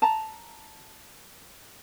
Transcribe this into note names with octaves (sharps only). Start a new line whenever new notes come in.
A5 A#5